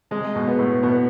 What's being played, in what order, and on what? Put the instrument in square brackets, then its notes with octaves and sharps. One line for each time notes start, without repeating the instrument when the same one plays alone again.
[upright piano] C3 [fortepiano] G#3
[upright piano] B2
[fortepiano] B3
[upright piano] A2
[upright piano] B2 [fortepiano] B3